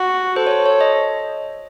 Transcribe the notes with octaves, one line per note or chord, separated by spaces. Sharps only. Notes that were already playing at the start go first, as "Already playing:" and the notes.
Already playing: F#4
A4 C5
C#5
C5
C#5
D#5